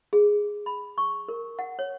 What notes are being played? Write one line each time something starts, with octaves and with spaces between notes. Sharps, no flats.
G#4
B5
C#6
A#4
F#5
C#5